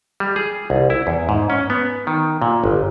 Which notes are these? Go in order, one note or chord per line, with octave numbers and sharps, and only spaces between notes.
G3
G#4
C2
E4
E2
G#2
C#4
B3
D#3
A#2
G1